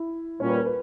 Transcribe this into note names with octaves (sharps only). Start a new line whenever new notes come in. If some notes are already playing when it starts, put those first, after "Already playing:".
Already playing: E4
A#2 G3 C#4 C#5
B4
A#4
B4